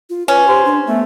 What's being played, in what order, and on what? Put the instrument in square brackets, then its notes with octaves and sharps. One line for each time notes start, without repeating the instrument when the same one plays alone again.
[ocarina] F4
[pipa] C#4 [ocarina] B4
[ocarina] G4 [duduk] C5
[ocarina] D4
[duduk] A3 [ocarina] B3